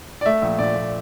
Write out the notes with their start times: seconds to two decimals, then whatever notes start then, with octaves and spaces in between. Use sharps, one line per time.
0.21 D5
0.26 A3 E5
0.42 A#1
0.59 A#2 D5
0.75 A#1